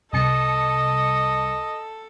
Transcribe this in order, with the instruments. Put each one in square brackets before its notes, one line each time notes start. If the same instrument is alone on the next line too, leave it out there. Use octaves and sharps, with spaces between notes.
[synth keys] C2 A5 C#7 [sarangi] A4 [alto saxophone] D#5